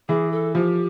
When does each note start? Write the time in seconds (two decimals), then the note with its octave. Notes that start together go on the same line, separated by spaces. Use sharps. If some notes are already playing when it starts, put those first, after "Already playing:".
0.08 E3 G#4
0.32 A4
0.55 F3 G4